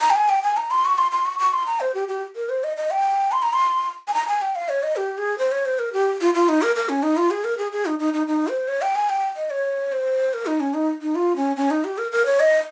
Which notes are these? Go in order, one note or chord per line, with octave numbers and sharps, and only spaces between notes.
A#5
G5
G#5
G5
G#5
A#5
C6
C#6
C6
C6
C#6
C#6
C6
A#5
C5
G4
G4
A#4
C5
D#5
D#5
G5
C6
A#5
C6
G#5
A#5
G#5
G5
F5
C#5
D#5
G4
G#4
C5
C#5
C5
A#4
G4
F4
F4
D#4
A#4
A#4
C#4
D#4
F4
G#4
A#4
G#4
G#4
D#4
D#4
D#4
D#4
C5
C#5
G5
G#5
G5
D#5
C#5
C5
A#4
D#4
C#4
D#4
D#4
F4
C#4
C#4
D#4
G4
A#4
A#4
C#5
D#5